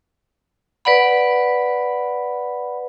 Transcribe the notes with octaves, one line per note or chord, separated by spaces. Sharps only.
B4 D5 F#5 B5